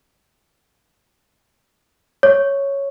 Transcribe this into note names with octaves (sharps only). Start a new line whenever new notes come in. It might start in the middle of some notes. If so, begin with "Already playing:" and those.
C#5